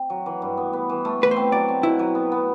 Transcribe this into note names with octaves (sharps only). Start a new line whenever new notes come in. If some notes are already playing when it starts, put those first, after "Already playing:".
Already playing: C4
F#3
E3
G2
B3
B3
E3
A3
E3 B4
C5
C4
F#3 D5
C4
B2 E4
F#3
B3
B3